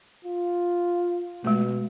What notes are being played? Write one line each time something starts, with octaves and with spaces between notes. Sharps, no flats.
F4
B2 G#3 A3